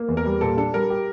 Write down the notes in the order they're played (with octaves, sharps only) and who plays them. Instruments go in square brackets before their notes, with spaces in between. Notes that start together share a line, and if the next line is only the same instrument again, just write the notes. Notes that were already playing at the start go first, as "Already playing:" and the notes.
Already playing: [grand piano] A#3
E2
[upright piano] A#4
[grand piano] G3
[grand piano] A#2 [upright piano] A4
[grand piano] D4 [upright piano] A4
[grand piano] G3 [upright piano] A#4
[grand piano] G4